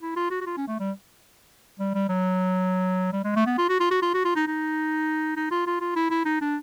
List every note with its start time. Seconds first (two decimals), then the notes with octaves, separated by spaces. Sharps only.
0.01 E4
0.16 F4
0.30 F#4
0.41 F#4
0.46 F4
0.57 C#4
0.68 A3
0.80 G3
1.79 G3
1.94 G3
2.09 F#3
3.13 G3
3.24 G#3
3.36 A3
3.46 B3
3.58 F4
3.69 F#4
3.80 F4
3.91 F#4
4.02 F4
4.14 F#4
4.25 F4
4.35 D#4
4.47 D#4
5.37 D#4
5.51 F4
5.67 F4
5.80 F4
5.96 E4
6.10 E4
6.25 D#4
6.41 D4